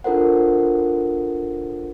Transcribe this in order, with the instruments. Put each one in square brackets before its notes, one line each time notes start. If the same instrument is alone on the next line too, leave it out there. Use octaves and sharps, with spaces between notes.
[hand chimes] D4 F4 A4 A#4 C5 F#5